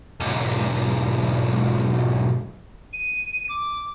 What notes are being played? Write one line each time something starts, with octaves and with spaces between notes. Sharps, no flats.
B1 G#2
D#7
D6